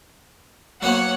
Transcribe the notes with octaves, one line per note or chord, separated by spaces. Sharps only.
F#3 A#3 B3 C#5 F#5